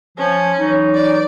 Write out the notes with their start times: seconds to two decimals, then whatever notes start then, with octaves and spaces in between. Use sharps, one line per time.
0.18 F3 C#4
0.58 E3 F#3 D#4
0.95 D5